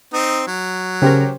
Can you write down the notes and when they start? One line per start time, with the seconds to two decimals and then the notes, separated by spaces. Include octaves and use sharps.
0.13 C4 D#4
0.47 F#3
1.02 C#3 C#4 G4 A#4 C5